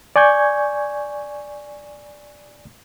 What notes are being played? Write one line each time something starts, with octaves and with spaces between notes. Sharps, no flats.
D5 G#5 C#6 G6 G#6